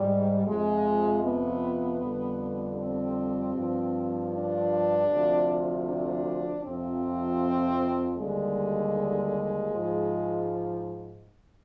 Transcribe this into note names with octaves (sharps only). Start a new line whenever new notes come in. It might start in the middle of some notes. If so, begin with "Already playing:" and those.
Already playing: G#2 G3
F2 C3 F3 G#3
B3
F2 D3 G3
C4
G2 F3
D4
D2 C3 F3
D4
F2 C3 F3 C4
D#2 D3 G3 G#3
G#2 F3